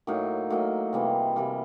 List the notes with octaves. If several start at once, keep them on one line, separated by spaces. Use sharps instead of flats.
A2 F#3 A#3 D#4
A2 F#3 A#3 D#4
C3 E3 G3 A#3
C3 E3 G3 A#3